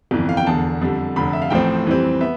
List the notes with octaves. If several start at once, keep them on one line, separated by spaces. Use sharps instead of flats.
G1 F2 E3
F5
G5
E1 E2 D3 A5
F2 D3 G3
F1 F2 D3 B5
E5
F5
A1 A2 F3 C4 G5
F2 E3 G3 C4
B3 E5